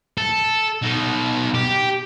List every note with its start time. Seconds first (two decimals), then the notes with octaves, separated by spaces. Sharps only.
0.18 A4
0.82 B2 D#4
1.54 G4